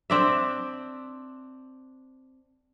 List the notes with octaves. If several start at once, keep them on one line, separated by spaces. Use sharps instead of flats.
C4 D4 E5